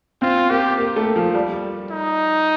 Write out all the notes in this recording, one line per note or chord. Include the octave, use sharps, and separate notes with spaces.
C4 F4
A#3 G4
A#3
A3
F3
G3
D#4